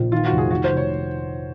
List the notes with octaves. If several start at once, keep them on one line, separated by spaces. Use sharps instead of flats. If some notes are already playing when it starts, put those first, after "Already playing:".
Already playing: A#1
D#3 F4
F#4
F1
G#4
D#3 F#4
C5
F1
C#5